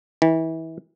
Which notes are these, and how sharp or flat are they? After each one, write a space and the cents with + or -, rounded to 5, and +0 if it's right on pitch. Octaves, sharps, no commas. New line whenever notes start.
E3 -30